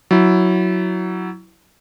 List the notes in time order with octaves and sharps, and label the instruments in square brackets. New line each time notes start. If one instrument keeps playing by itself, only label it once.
[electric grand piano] F#3 E4